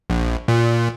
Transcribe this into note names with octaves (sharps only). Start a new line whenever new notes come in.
A#1
A#2